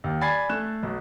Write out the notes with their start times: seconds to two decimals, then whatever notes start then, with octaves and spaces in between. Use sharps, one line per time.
0.04 D#2
0.21 D5 G#5 B5 G#6 A6 C7
0.49 A3 F#6 E7
0.83 B1